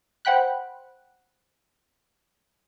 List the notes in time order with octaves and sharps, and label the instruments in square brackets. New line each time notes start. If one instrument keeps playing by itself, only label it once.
[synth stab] C5 F#5 G5 B5 F#6